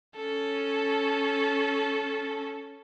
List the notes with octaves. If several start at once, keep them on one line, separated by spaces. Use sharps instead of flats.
C#4 A4